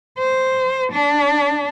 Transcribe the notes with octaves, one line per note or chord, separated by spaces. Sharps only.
C5
D4